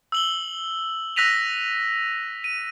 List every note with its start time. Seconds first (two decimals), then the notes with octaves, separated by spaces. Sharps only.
0.12 E6 F#7 G7
1.16 E6 F#6 A#6 B6 D#7 F7
2.44 D#7